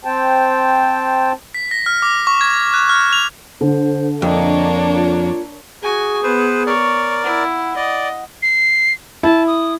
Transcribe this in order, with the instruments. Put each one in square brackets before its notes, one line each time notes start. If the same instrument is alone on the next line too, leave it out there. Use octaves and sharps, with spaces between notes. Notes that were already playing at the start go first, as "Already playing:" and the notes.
[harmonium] C4 C5 G5 A5
[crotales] B6
A#6
F6
D6
C#6
G#6
F#6
F6
F7
[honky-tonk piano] D3 [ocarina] C5
[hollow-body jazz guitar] F2 [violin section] A#3 D4 C#5 [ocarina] D#5
[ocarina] F4
[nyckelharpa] F#4 G#5 [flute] G#4
[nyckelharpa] B3 [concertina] B4 C5
[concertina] A#4 D5 [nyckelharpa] C#5
[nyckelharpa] E4 [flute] F#5
[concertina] D5 [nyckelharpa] D#5
[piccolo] C7
[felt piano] E4 [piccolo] A5
[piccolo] D#6